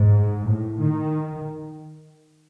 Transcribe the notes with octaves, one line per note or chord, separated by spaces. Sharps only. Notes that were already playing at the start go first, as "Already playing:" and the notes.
Already playing: G#2
A2
D#3